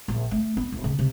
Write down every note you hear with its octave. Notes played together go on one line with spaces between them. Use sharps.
A#1
A3
B3
D1
C#3
C3